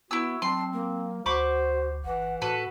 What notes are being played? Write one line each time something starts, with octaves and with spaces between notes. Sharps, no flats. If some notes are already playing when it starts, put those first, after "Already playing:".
B3 E4 F#4 E6
F#3 C4 A5 C6
A#3
D2 F#4 C5 B5 C#6 D6
G1 E3 F#5
A2 F#4 A4 B4